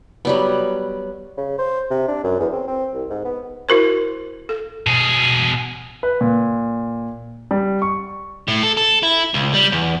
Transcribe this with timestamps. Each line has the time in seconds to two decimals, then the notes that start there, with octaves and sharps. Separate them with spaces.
0.25 F#3 G3 B3
1.37 C#3
1.59 C5
1.90 C3
2.08 D4
2.24 F#2
2.40 E2
2.52 C4
2.68 C4
2.94 C2
3.10 G#2
3.25 B3
3.69 E4 F#4 A#4 C5
4.49 A4
4.87 B2 G#4
6.03 B4
6.21 A#2
7.51 G3
7.82 C#6
8.48 A2
8.63 A4
8.77 A4
9.03 E4
9.34 C#2
9.54 G3
9.72 E2